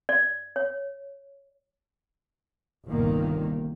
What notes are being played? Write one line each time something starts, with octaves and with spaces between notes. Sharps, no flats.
D5
C#5
G1 C2 G2 A#2 D#3 A#3